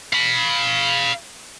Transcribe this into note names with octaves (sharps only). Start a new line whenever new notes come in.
F5 B5